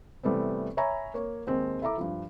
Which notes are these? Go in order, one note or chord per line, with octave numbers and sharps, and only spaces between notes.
C3 E3 G3 A3 B3 C4
C#5 E5 G#5 A#5 B5
A#3 C#5
D#2 G#3 C4
E4 A4 E5 A#5 D6
G2 F3